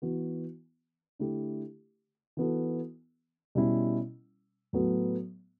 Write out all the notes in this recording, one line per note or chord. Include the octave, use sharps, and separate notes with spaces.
E3 B3 F#4
D3 A3 E4 G4
E3 B3 F#4 A4
B2 G3 C#4 E4
A2 F#3 B3 F#4 A4